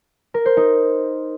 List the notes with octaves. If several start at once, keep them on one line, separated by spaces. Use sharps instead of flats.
A#4
C5
D#4